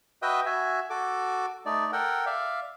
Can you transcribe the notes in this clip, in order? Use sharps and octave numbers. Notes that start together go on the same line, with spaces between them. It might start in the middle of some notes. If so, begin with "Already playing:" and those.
F#4 B4 D#5 E5 G5 D#6
F#4 E5 G#5
F#4 A4 D6
A3 D#4 D5
A4 A#4 F#5 G5
D5 E5 F5